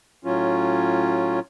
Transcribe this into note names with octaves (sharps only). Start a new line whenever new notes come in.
A2 F#3 C#4 F4